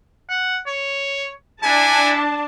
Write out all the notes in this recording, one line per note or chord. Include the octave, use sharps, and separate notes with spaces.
F#5
C#5
D4 E4 G#5 A5